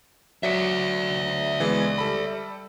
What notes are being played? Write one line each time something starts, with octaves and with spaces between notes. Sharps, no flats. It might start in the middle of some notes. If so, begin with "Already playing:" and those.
F#3 D5 E5 B6 C#7
E3 G#3 B3
G3 A4 B5